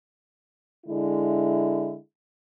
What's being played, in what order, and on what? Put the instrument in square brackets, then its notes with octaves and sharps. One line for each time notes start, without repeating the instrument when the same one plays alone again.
[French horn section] D3 G#3 E4